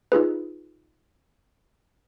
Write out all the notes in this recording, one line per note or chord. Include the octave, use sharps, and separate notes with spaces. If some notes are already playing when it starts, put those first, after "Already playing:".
D#4 F4 G#4 B4